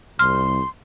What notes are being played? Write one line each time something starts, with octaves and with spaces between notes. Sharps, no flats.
C2 C6 F6